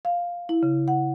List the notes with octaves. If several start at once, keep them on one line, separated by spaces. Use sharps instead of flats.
F5
E4
C#3
F#5